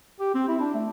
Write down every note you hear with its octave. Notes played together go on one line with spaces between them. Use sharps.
G4
C4
E4
D4
A3